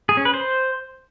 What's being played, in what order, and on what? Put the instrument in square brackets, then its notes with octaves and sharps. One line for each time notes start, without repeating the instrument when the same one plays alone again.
[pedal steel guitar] G#4
C#4
B4
C5